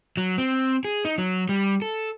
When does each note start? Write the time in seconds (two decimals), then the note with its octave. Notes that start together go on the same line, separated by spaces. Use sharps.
0.17 F#3
0.38 C4
0.85 G#4
1.05 D#4
1.18 F#3
1.49 G3
1.82 A4